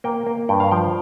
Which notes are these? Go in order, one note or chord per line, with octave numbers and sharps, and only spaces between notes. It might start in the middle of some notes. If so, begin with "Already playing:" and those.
A#3 G5
A#3
G2 G5
F5
F3 G5